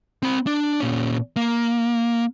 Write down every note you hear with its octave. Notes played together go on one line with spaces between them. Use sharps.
C4 B5
D4
A#2 C#4
A#3